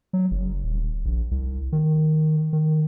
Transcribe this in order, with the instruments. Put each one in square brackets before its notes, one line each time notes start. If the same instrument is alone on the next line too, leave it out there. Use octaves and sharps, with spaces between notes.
[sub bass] F#3
F#1
D#1
A#1
C2
D#3
D#3